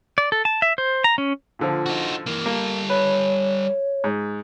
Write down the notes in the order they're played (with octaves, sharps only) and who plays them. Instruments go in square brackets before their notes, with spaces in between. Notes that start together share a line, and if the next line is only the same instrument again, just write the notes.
[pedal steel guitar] D5
A4
A5
E5
C5
A#5
C#4
[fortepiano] A#2 D3 F3
[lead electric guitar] D#4 F#4
E3 A#3
[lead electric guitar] G3 A4 [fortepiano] A#3
[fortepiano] B4 [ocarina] C#5
[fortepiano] G#2